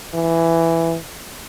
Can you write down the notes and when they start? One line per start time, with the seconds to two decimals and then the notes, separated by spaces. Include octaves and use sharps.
0.14 E3